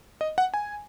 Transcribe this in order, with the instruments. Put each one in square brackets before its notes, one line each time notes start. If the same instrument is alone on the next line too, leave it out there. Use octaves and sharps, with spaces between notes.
[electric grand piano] D#5
F#5
G#5